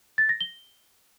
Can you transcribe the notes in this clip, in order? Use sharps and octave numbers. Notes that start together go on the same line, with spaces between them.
A6
A#6
G7